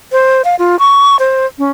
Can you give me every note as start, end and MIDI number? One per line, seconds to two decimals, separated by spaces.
0.12 0.42 72
0.45 0.55 77
0.59 0.79 65
0.79 1.17 85
1.19 1.46 72
1.58 1.71 61